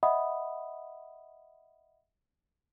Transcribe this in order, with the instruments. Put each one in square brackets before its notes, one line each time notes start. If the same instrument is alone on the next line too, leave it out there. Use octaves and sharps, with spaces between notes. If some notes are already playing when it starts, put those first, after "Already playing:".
[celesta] D#5 E5 F#5 B5 D#6